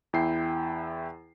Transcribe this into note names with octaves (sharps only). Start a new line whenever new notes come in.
E2 E4 G5 C7